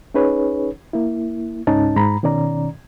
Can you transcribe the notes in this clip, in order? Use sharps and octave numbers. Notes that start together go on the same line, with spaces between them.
C#4 D#4 G#4 B4 C#5
A#3 E4
C#2 G#2 C#4 D#4 A5
G#2 A#5 B5
B2 D#3 C#4 D5 A#5